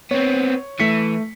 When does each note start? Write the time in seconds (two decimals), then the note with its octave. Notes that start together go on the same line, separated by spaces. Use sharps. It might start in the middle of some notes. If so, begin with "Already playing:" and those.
0.11 B3 C4 C#5
0.80 E3 A3 B6 C#7